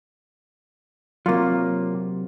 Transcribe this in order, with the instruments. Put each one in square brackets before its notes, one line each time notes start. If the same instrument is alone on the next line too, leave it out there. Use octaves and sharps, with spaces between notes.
[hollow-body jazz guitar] C3 F#3 [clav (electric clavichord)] A#3 F4